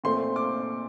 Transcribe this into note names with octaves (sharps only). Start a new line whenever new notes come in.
A#2 A3 C4 C6
D6